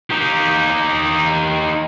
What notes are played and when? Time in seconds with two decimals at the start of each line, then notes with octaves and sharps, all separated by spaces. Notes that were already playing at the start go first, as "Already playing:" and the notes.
0.10 D#4 G4